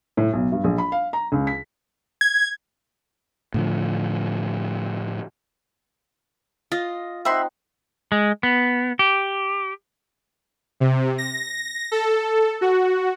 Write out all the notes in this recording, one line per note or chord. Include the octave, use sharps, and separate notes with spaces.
A2
B1
G2
A#1
B5
F5
A#5
C#2
B6
G#6
A2 D3 F3
F4 D#5
C4 D#4 E5 F#5 B5 C6
G#3
B3
G4
C3
A#6
A4
F#4